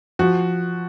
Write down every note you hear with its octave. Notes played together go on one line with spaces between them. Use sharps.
F3 F#4